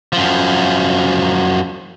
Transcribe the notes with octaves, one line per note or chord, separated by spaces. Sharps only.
F#2 F3